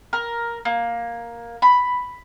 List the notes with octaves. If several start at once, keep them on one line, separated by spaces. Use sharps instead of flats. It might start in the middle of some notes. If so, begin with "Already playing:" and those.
A#4
A#3
B5